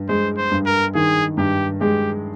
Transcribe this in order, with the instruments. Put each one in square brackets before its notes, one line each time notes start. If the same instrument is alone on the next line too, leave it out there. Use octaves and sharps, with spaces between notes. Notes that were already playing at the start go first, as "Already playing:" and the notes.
Already playing: [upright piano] G2
[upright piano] G#3 [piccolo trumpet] C5
[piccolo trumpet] C5
[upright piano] G2
[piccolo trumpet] A#4
[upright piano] D#3 [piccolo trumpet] G#4
[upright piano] G2 [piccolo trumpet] G4
[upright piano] G#3 [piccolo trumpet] G4